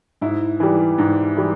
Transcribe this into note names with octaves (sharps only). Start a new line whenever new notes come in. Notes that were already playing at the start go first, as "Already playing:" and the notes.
G#2 E4
E3 G3
G#2
E3 G3